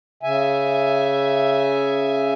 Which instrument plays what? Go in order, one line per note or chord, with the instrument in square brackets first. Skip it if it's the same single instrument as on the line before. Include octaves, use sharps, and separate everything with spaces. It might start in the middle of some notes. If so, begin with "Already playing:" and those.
[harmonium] C#3 E5 G#5